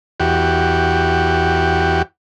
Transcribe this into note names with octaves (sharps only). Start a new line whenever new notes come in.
E2 F#4 G4